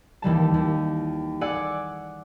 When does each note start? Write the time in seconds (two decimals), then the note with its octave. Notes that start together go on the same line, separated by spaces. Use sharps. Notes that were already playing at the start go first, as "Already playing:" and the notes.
0.22 D#2 E3 G3 A5
0.54 D#2
1.41 G#4 D5 F#5 G#5 D6 E6